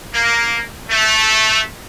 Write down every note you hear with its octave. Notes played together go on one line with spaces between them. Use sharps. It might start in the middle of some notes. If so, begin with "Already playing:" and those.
A#3
A3